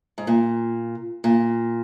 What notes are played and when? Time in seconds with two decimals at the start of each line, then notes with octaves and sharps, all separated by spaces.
0.18 G#2
0.27 A#2
1.24 A#2